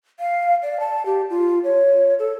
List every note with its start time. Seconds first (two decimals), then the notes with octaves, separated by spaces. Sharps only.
0.20 F5
0.63 D5
0.80 A5
1.06 G4
1.30 F4
1.64 C#5
2.19 A4